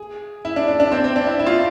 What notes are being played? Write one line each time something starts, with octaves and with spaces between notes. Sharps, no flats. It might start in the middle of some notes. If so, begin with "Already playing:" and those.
Already playing: G#4
E4
D4
D4
D4
C4
C4
D4
E4
E4
F4
E4